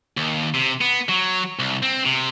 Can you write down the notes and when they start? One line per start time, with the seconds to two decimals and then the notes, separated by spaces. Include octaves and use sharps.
0.17 D#2
0.54 C3
0.81 B3
1.09 F#3
1.59 C2
1.83 C4
2.06 C3